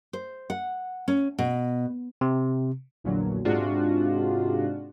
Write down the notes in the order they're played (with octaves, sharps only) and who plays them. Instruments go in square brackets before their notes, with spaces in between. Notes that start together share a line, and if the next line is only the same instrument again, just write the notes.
[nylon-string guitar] C5
F#5
C#4
B2
[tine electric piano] C3
[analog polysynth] A#1 E2 A#2 D3 F#3
G#2 C3 G#3 D4 F4 F#4